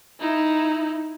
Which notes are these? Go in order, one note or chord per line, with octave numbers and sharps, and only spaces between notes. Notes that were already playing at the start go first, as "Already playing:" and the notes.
D#4 E4